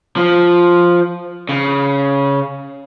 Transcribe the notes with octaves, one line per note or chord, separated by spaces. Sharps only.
F3
C#3